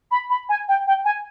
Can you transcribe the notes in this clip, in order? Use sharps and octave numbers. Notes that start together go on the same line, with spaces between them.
B5
B5
G#5
G5
G5
G#5